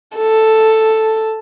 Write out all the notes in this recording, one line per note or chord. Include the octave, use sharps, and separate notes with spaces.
A4